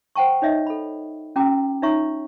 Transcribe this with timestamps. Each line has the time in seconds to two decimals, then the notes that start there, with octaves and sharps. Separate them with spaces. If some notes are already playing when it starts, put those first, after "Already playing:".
0.16 C5 F#5 G5 A5 C#6
0.42 D#4 C#5 D#5 E5
0.67 A4 B5
1.36 C#4 F#4 G5 A#5 D6 D#6
1.82 D#4 F4 C#5 E5 A#5 C#6